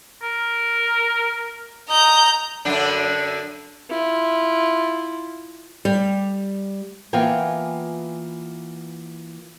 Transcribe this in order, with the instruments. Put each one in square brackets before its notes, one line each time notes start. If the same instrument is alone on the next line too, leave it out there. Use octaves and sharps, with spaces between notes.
[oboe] A#4
[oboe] D#5 [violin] A#5 G6
[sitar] F#2 D3 D4
[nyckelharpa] E4 F4
[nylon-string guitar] G3
E3 A#3 B3 F4 G5 G#5